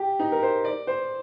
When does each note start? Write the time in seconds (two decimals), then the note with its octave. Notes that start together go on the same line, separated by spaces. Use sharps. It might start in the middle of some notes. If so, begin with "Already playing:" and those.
Already playing: G4
0.19 D#4
0.32 A#4
0.43 C5
0.65 D5
0.87 C5